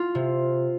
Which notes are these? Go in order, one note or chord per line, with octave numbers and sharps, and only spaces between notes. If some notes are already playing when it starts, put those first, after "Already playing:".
Already playing: F4
C3